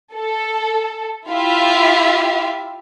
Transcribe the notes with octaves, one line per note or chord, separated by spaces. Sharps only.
A4
E4 F4 G4 E5 F5